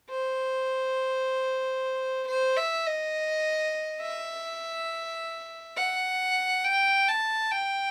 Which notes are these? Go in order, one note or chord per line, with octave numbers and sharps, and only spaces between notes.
C5
C5
E5
D#5
E5
F#5
G5
A5
G5